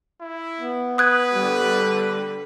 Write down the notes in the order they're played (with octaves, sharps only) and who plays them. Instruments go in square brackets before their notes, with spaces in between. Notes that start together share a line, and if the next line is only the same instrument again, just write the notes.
[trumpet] E4
[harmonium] B3
[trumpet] B4 [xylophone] D#6 F#6 G#6
[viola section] D3 G3